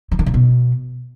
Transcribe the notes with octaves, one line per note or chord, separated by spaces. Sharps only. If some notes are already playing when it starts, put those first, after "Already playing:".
E3
D#3
C#3
B2